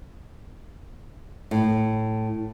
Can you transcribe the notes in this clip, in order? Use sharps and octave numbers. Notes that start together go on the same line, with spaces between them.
A2